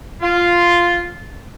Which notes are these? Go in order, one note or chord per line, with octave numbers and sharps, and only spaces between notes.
F4